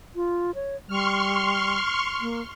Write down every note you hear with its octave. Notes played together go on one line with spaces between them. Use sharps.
F4
C#5
G3 C6 C#6 F6
A#3